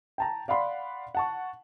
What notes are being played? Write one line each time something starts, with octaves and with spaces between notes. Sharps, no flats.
G5 A5 A#5
D5 F5 F#5 B5 C6
F#5 A5 C#6